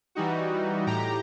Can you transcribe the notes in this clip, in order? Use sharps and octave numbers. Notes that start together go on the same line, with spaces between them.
E3 G3 D#4 F#4
A2 G4 A#5